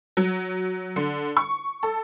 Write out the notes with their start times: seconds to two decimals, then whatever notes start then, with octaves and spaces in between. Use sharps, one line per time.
0.17 F#3
0.96 D3
1.37 C#6
1.83 A4